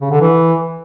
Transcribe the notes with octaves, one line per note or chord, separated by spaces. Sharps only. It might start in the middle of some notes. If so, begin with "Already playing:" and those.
C#3
D3
E3